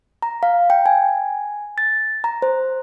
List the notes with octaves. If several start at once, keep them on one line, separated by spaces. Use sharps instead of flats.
A#5
F5
G5
G#5
A6
A#5
C5